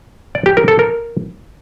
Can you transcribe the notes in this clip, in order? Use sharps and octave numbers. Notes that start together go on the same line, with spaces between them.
D5
G4
A#4
A4
A#4